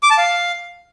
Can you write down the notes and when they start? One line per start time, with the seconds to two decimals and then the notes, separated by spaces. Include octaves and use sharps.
0.03 D6
0.10 A5
0.18 F5